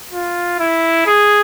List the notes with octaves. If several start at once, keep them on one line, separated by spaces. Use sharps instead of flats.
F4
E4
G#4